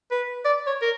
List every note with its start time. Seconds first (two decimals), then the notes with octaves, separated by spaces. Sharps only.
0.11 B4
0.45 D5
0.67 C#5
0.82 A#4